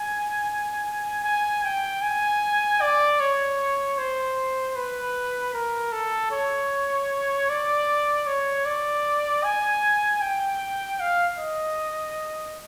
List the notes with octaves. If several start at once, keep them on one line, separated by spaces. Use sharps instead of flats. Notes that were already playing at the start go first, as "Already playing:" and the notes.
Already playing: G#5
G#5
G5
G#5
D5
C#5
C5
B4
A#4
A4
C#5
D5
C#5
D5
G#5
G5
F5
D#5